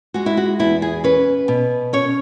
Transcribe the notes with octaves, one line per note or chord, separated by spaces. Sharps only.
G#3 F#4
E4
F#4
E2 E4
G#4
C#4 B4
B2
C#4 C#5